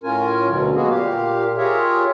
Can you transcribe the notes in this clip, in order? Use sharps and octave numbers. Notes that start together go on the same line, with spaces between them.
A2 C#4 F4 A#4 G#5
D2 B2 D3 F#3
G#3 A#3 B3 F#4 G#4
A#2 G4 F5
F4 G4 G#4 A#4 C#5 E5